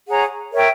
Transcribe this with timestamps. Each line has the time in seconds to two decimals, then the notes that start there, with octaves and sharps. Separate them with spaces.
0.08 G#4 C#5 F#5 A#5
0.51 A#4 C#5 E5 G5